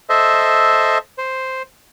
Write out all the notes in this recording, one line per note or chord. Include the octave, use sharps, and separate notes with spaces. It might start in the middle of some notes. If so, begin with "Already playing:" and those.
A4 C5 D#5 E5
C5